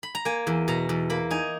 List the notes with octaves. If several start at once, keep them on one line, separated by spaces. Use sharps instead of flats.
B5
A#5
A#3 G#5
E2
B2 A#5
E2
A#3 B5
D#4 G#5